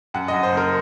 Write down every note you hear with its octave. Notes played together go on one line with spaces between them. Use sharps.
F#2 F#5
F#2 D#5
C5
F#1 A#4